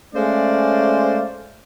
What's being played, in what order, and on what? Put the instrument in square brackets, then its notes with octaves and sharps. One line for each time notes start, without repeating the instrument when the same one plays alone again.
[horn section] G#3 A3 C#4 C5 D5 F5